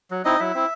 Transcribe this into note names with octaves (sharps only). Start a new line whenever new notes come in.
F#3
C4 D#4 E4 D#5
F#3 E4 E5
C4 E4